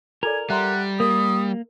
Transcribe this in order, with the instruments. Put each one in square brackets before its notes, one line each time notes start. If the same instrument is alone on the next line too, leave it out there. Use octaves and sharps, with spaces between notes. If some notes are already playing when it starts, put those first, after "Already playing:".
[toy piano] F4 A4 D5 [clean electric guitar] A#4 [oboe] G#5
[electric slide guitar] G3 [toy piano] E5 A#5 C6 [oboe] F#5
[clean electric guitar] A#3 [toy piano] A#4 [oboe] D#6